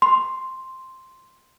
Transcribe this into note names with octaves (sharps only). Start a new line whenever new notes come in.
C6